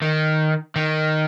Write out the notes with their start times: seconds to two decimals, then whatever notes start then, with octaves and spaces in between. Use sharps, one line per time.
0.02 D#3
0.76 D#3